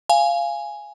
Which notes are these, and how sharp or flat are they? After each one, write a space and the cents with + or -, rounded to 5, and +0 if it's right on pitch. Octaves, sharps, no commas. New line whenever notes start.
F5 -15 G#5 +0